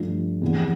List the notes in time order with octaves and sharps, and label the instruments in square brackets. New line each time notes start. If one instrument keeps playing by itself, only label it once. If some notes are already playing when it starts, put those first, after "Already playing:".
Already playing: [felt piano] G2 F3 A3 D4 F4
E2 C3 F3 B3